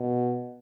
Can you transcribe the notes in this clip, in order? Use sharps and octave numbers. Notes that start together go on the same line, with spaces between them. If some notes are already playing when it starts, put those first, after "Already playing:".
Already playing: B2